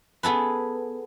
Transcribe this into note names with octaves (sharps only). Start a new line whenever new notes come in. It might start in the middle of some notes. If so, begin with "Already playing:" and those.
B3 G#4 A4 B4